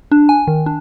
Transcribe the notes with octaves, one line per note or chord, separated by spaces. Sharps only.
D4
G#5
D#3
D4